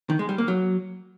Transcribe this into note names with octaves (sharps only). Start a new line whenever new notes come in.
D#3
G#3
G3
A#3
F#3